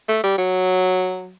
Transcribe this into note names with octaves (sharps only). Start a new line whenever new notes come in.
A3
G3
F#3